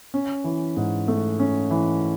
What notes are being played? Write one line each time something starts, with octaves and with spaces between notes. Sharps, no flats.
C#4
E3
G#2
A3
C#4
E3